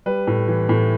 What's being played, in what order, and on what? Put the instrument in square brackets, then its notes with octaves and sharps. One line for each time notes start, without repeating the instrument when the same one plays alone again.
[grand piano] G3 B4
A2
E3
A2